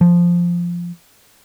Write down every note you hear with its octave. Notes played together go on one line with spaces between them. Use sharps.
F3